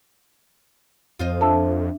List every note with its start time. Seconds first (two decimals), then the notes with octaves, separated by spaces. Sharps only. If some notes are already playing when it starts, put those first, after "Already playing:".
1.19 F2 F4 C5 D#5
1.41 D4 A4 E5